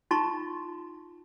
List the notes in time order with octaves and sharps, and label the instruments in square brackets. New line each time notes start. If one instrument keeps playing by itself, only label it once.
[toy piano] D#4 F4 A5 A#5 C6 C#6